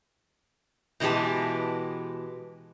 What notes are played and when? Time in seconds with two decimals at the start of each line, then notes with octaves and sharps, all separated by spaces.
1.00 B2 E3 G#3 G4 A5